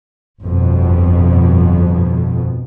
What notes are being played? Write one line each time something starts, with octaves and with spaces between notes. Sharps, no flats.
G1 F2 B2